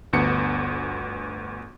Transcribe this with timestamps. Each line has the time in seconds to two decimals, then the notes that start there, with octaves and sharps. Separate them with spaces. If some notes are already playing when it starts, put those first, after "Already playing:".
0.13 G1 D2 B3 C#7